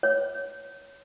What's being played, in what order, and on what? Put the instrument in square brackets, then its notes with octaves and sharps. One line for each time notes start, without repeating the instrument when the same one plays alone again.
[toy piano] C#5